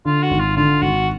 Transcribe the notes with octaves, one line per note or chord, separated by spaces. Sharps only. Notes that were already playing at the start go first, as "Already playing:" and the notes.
D3 F4
F#4
G#1
F4
D3 F4
G#1 F#4